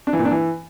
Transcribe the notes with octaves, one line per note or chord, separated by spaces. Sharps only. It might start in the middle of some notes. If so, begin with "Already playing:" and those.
D4
E3
A#2
D4
E3